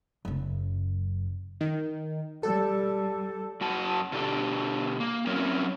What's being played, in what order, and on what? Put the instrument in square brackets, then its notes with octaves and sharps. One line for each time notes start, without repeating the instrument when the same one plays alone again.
[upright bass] F#1 F#2
[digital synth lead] D#3
[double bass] G3 [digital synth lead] A4
[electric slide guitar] F#2 F#4 A5
B2 D3 D4 G4 A4
A#3
F#3 C4 C#4 E4 A#4 C#5